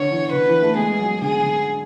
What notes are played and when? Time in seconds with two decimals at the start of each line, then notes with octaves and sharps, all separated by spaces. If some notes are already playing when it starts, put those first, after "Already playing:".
Already playing: D3 C#5
0.11 E3
0.33 D3 B4
0.48 E3
0.62 A3
0.77 G#3 G#4
1.00 F#3
1.21 D3 G#4
1.44 D3